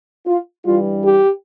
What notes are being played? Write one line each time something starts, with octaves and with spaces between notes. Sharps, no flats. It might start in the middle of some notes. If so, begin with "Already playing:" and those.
F4
G2 E3 G3 F4
G4